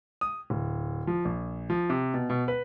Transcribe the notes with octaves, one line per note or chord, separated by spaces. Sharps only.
D#6
D1
F3
A#1
F3
C3
B2
B2
B4